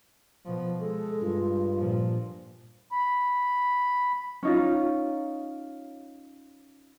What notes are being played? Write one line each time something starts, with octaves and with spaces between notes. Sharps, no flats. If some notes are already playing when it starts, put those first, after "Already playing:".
B2 F3
G#3 A4
G2 F4
A#2 F3
B5
C#4 D#4 F4